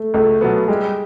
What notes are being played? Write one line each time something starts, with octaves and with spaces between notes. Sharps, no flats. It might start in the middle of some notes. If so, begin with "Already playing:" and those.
Already playing: A3
C#2 A3
B2 F#3 B3
G3 G#3